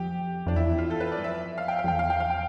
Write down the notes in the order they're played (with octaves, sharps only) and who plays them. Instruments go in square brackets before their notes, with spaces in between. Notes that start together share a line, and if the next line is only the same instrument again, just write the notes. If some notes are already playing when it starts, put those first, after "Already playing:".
Already playing: [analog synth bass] F2 [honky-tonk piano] G4
[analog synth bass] F2 [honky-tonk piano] D4
[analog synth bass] E2 [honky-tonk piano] E4
[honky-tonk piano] F4
A4
B4
D5
[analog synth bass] G2
[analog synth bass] F2 [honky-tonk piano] E5
[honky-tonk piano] F5
G5
F5
[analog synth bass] F2
[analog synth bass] E2 [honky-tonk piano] G5
[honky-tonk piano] F5
G5
F5
G5